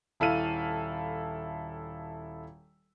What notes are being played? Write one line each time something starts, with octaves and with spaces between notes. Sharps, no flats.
D#1 E4 A4 F5 D#7